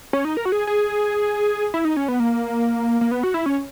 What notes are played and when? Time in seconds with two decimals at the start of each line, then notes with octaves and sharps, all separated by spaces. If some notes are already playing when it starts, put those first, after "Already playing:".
0.13 C#4
0.25 D#4
0.37 A#4
0.45 F#4
0.52 G#4
0.67 G#4
1.74 E4
1.85 D#4
1.97 C#4
2.08 B3
2.20 A#3
3.01 A#3
3.11 B3
3.23 F#4
3.34 E4
3.46 C#4